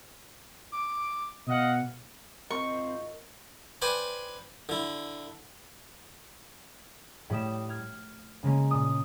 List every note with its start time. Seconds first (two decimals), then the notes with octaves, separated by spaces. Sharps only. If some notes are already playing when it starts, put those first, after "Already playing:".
0.72 D6
1.47 B2 D#5 F5 F#5
2.51 G#1 C4 F4 A#4 D#5 C#6
3.82 B4 C5 D5 G5 G#5 B5
4.69 D3 E4
7.30 A2 G3 D#6 E7
7.69 F6 G#6
8.43 C#3 G#3 A#3 C#4
8.71 A#2 D#6